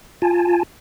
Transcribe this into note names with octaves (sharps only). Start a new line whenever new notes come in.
F4 G#5 A5